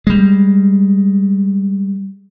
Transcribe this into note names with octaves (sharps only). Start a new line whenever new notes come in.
G3 G#3